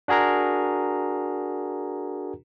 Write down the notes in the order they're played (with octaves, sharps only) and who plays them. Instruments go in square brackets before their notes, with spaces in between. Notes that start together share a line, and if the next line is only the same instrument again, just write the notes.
[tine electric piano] D4 F#4 G#4 A#4 A#5